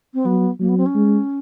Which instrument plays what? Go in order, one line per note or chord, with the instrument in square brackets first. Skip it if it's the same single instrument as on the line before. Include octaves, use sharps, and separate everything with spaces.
[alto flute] C4
[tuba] F#3 [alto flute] B3
[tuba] F#3 [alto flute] A#3
[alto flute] B3
C4
C#4
[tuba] G#3